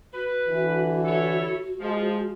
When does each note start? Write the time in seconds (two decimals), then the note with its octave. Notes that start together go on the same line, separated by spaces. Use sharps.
0.14 F#4 B4
0.48 D3 E3
1.05 E4 A4 C#5
1.80 F3 G#3